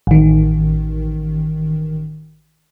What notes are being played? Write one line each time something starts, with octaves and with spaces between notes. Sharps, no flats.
A1 D#3